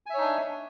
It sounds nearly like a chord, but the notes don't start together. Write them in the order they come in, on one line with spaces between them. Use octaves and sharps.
G#5 E5 C#5 D#4 D4